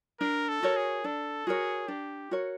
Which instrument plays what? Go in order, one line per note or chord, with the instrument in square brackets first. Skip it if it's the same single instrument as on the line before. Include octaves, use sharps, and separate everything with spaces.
[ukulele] D4 [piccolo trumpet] A#4
[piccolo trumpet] A4
[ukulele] F#4 A#4 C#5
[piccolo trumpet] G#4
[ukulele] D4 [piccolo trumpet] A4
[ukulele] F#4 A#4 C#5 [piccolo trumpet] G#4
[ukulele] D4 [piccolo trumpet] G4
[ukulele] F#4 A#4 C#5